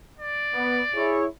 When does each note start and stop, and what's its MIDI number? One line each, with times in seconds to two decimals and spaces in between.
0.19 1.19 74
0.54 0.80 59
0.95 1.25 64
0.95 1.25 68
0.95 1.25 73